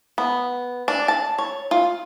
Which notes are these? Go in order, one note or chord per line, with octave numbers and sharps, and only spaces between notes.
B3
D4
A5
C#5
F4